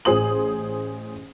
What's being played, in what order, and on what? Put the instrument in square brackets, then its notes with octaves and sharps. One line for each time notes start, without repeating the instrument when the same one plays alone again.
[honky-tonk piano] A1 G#4 C5 D#6 F#7